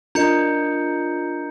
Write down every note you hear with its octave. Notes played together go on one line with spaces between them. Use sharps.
D4 F4 A#4 D#5 A#5 G6 C#7